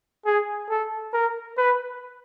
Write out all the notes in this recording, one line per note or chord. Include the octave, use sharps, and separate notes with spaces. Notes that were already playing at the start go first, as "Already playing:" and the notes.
G#4
A4
A#4
B4